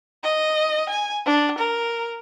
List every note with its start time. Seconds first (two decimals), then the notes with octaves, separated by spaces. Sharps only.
0.24 D#5
0.90 G#5
1.26 D4
1.59 A#4